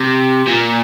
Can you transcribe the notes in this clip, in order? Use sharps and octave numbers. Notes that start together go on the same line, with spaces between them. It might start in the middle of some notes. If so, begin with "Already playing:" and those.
Already playing: C3
A#2